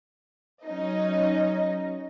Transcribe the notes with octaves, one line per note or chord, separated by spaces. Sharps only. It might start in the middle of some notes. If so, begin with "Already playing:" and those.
F#3 C#4 D#4 D#5